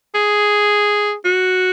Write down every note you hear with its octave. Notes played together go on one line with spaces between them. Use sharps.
G#4
F#4